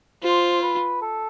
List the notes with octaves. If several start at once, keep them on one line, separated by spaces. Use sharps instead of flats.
F4 C5
B4
A4